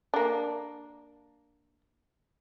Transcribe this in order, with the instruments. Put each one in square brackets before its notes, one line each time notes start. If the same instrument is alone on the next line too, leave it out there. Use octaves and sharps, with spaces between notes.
[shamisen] A#3 D4